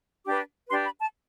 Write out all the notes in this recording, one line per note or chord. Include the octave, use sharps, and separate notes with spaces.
D4 G4 B4 D6
D4 G4 B4 C6
B5
A5